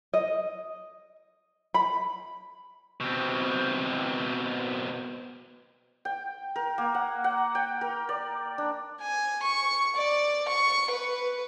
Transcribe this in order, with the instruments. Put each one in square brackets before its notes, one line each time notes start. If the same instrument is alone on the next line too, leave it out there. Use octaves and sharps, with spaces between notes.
[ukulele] D#5
B5
[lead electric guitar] B2 C4
[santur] G5
A#4
A#3
F#5
F#5
G5
A#4
D5
D4
[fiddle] G#5
C#6
D5
C#6
B4